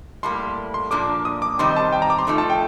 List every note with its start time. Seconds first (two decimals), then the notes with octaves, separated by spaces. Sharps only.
0.23 A2 G3 A#3 C6
0.74 C6
0.91 A#2 F3 A#3 D4 D6
1.25 D#6
1.42 D6
1.59 C3 D#3 G3 C4 D#4 C6
1.76 A5
1.92 G5
2.02 A#5
2.10 D6
2.18 C6
2.27 F3 A3 D#4
2.38 A5
2.50 G5